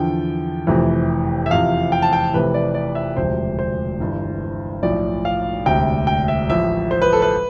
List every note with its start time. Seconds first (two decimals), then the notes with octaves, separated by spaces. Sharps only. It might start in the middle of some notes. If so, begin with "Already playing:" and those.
Already playing: E2 D3 F3 G5
0.67 F1 F2 C3 E3
1.46 E5
1.50 E2 C3 F3 F5
1.92 G5
2.02 A5
2.13 G5
2.33 F1 F2 C3 E3 B4
2.54 D5
2.74 D5
2.95 E5
3.17 E1 D2 C3 F3 C5
3.59 C5
4.00 G1 G2 E3
4.83 B1 A2 F3 D5
5.25 F5
5.66 E1 D2 C3 G5
6.07 G5
6.28 E5
6.49 A1 A2 F3 E5
6.91 C5
7.02 B4
7.13 A4
7.22 B4